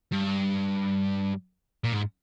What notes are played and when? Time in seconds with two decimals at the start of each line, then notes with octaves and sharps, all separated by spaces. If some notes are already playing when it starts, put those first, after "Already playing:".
0.12 G2
1.84 A#2
1.93 G#2